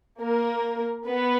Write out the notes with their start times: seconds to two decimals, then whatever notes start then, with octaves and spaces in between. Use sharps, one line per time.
0.20 A#3 A#4
1.06 B3 B4